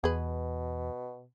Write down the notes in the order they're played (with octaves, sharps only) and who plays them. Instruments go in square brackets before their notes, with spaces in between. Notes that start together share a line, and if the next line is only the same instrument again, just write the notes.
[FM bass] E2 [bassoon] B2 [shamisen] G#4 B4